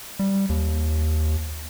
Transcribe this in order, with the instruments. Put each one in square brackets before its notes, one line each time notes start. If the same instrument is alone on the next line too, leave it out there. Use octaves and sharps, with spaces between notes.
[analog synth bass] G3
D#2